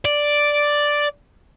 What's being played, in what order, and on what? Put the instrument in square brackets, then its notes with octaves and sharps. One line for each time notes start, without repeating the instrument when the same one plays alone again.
[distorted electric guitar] D5